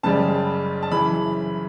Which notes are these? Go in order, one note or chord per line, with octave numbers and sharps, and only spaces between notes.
F#1 F#2 C#3 G3 A5
A5
F#2 C#3 E3 B5